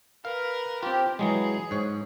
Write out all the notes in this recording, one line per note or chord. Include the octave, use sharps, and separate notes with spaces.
A#4 B4 F5
C4 F4 G4
E3 F#3 G#3 G#4
G#2 C#5